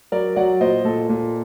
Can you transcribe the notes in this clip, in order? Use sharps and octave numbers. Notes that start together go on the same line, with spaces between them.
F#3 A#4 D5
F#3 D5 F#5
A#2 C5 D#5
A#2 A4
A#2